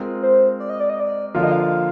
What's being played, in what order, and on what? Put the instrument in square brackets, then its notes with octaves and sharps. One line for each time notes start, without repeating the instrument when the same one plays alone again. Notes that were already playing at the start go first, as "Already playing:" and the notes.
Already playing: [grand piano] G#3 C4 F4 A#4
[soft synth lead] C5
D5
D#5
D5
D#5
D5
[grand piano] D3 F3 A#3 F4 [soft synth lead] F5
[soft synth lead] D#5
F5